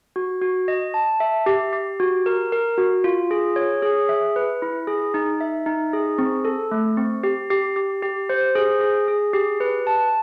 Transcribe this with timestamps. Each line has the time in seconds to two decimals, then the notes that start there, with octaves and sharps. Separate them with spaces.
0.16 F#4
0.42 F#4
0.68 D#5
0.94 A5
1.20 E5
1.46 G4
1.73 G4
2.00 F#4
2.26 A#4
2.52 A#4
2.78 F#4
3.04 F4
3.31 G#4
3.56 C#5
3.82 G#4
4.09 E5
4.36 B4
4.62 E4
4.87 G#4
5.14 D#4
5.41 E5
5.66 D#4
5.93 G#4
6.18 C4
6.45 A4
6.71 A3
6.97 C4
7.23 G4
7.50 G4
7.76 G4
8.03 G4
8.29 C5
8.55 G#4
8.81 G#4
9.08 G#4
9.33 G4
9.60 B4
9.87 A5